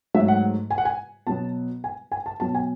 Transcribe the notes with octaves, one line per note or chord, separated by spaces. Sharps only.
G#2 F#3 A3 E5
F#5
G#5
F#5
G#5
B2 F#3 B3 A5
G#5
G#5
A5
B2 F#3 B3 A5
G#5